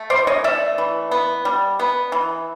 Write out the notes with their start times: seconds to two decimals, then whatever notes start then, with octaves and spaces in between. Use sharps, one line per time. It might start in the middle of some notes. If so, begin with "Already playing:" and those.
Already playing: A3
0.10 E3 C5 D5
0.27 C#5 D#5
0.44 A3 D5 E5
0.78 E3
1.11 B3
1.45 G3
1.79 B3
2.12 E3